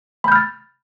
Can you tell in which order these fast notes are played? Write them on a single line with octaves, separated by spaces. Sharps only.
B5 G6 F6 A6